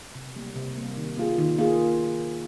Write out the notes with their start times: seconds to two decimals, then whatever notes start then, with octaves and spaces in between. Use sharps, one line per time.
0.15 C3
0.36 G3 A#3
0.56 C3
0.76 G3 A#3
0.97 D#3
1.17 A#3 F4 G#4
1.38 D#3
1.58 A#3 F4 G#4